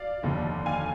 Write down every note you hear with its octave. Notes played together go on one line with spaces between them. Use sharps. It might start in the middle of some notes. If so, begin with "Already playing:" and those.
Already playing: D5 F5
F1 D#2 D3
F5 G#5